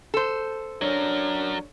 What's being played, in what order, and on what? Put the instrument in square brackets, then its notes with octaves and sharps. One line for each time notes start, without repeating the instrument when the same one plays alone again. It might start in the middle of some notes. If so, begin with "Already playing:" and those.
[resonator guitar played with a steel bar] A4 C5
[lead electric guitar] F#3 A#4 [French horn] D4 [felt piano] C#5